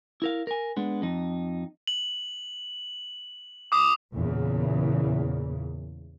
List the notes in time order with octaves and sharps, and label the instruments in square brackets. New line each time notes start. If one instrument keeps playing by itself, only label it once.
[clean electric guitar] E4 A#4 F5
A#4 G#5
G#3 B3 D4
F2 D#4
[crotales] F#7
D6 D#6
[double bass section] E2 A#2 C#3 E3